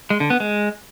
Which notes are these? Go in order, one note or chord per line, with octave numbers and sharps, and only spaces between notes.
G#3
D3
B3
G#3